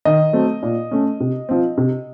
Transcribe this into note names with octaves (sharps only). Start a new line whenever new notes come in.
D#3 D#5
F#3 A3 C4
A#2
A3 C#4
C3
F3 C4
C3